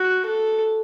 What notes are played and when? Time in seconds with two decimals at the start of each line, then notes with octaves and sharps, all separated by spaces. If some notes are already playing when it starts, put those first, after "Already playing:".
Already playing: F#4
0.26 A4